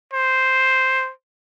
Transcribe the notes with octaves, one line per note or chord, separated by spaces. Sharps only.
C5